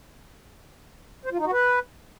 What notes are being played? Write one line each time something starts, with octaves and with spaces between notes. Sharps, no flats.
C5
F4
D#4
F#4
B4